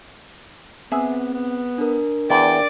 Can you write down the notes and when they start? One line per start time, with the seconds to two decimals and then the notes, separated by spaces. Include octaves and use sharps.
0.92 B3 C4 G#4 E5
1.34 B3
1.78 D4 A#4
2.30 E2 D5 G5